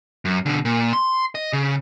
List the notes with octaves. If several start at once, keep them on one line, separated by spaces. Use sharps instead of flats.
F#2
B2 D3
A#2
C6
D#5
C#3